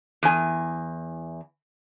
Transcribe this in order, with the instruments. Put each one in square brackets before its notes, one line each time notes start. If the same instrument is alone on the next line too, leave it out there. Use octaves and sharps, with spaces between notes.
[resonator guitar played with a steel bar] E2 G#5